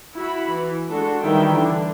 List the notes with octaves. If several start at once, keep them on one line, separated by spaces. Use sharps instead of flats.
E4 F#4 B5
E3
G#3 D4 F#4 A4
D#3 E3 G3 E4 E5 G5
D3 D4